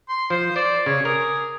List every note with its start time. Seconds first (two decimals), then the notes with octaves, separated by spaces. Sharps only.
0.09 C6
0.30 F3 C5
0.56 C5 D5
0.86 C#3 C#5
1.05 G#4 A#4